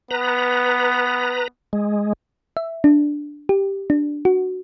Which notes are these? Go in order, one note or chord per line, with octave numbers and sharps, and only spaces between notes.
B3 B4 A#5
G#3
E5
D4
G4
D4
F#4